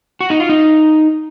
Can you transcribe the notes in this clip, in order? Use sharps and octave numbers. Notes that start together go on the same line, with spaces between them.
F#4
D#4
F4
D#4